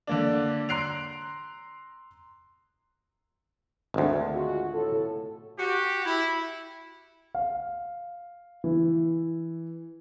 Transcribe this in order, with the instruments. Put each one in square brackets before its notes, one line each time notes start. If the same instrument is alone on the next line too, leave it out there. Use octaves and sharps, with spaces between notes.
[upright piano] D3 A#3 D4
A#5 C6 F#6 C7 D7 F7
[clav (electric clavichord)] G#1 D2
[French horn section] G#3 F4 F#4
A2 A4
[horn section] F#4 G4
E4
[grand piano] F5
E3